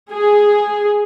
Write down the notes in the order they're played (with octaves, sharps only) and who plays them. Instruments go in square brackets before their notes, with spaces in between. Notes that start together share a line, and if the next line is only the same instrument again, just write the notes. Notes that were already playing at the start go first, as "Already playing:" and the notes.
[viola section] G#4